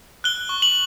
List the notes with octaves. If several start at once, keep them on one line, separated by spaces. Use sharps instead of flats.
F#6 G7
C#6
F#7